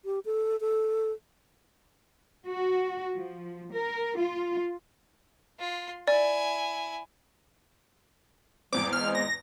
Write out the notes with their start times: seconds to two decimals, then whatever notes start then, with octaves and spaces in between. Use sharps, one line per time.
0.05 G4
0.25 A4
0.61 A4
2.45 F#4
3.14 F3
3.72 A#4
4.17 F4
5.59 F4 C6
6.08 E4 D5 G#5
8.73 G#1 E2 G3 C4 D6
8.93 G#3 F6
9.15 A#6